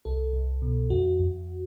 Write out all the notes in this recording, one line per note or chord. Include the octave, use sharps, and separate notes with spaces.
C2 A4
C2
B2
F2 F#4
F2